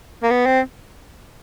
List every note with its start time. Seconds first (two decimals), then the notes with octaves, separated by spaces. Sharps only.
0.23 A#3
0.31 B3
0.46 C4